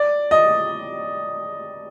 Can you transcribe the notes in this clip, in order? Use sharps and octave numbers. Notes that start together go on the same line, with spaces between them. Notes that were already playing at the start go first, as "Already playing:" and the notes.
Already playing: D5
D#5